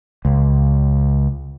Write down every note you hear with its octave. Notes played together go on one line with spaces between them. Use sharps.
C#2